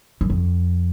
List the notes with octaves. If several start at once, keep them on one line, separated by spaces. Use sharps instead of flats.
F#2
F2